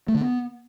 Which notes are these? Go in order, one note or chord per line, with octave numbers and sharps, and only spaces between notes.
A3
D3
B3